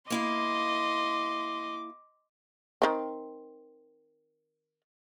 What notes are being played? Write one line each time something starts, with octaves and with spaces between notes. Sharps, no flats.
A#3 E4 D#5 F5 C6 D6
D#3 C4